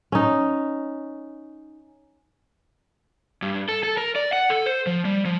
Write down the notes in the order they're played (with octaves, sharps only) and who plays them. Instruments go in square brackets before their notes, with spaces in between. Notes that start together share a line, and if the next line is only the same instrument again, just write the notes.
[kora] C#4 D#4
[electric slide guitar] G2
A4
A4
A#4
D5
F#5
A4
C5
F3
G3
F3